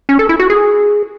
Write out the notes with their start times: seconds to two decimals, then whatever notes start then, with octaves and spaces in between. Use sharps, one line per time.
0.09 C#4
0.19 A4
0.29 E4
0.39 F#4
0.50 G#4